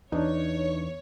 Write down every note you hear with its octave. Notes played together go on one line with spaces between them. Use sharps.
E2 D4 D#4 C#5